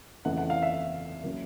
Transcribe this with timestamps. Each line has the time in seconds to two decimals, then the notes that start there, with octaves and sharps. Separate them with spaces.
0.25 F2 C#3 E3 A3 F#5
0.38 F#5
0.50 F5
0.62 E5
1.23 C#3 F#3 A#3